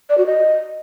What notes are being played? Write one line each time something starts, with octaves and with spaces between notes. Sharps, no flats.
D5
F#4
D#5